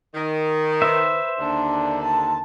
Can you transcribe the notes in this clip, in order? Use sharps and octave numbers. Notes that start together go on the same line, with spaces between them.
D#3
B4 C5 E5
D#2 D3 D4
A5